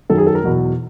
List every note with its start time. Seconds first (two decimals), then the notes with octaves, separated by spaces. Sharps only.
0.10 F#2 D#3 F#3 A4
0.18 G#4
0.27 A4
0.35 A#4
0.44 E2 B2 F#3